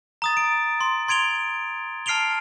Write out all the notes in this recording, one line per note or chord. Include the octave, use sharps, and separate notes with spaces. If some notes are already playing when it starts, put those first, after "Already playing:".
A#5 D#6 A6
D7
C6
C6 G#6 D7 F7 G7
A5 F6 C7 D7 F7 G7